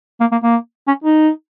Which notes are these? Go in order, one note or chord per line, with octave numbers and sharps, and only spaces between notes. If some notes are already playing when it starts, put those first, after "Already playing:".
A#3
A#3
A#3
C#4
D#4